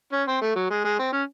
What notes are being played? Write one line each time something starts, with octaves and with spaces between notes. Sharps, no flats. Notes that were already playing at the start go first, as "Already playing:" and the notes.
C#4
C4
A3
F#3
G#3
G#3
C4
C#4